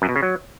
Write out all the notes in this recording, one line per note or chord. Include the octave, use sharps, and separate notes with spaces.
F#2
B2
C#3
F#3